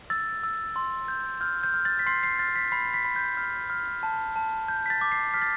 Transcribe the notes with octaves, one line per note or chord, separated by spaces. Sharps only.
E6 A6
E6
C6
G6
F6 G6
G6
F6
A6
B6
C6 C7
C7
F6 A6
B6
B5 C7
B6
B5
G6
F6
F6
A5
A5
G6
B6
A6
D6
C7
F6 B6
A6